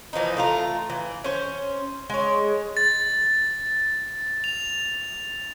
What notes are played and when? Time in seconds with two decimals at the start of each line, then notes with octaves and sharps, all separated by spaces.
0.13 E3 F3 A#3 D#4
0.37 A3 F4 A#4
0.90 E3
1.24 C#4 C5
2.10 G#3 C#5
2.77 A6
4.44 F7